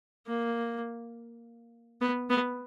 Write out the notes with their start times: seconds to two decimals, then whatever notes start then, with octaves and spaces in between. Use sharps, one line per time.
0.27 A#3
2.01 B3
2.29 B3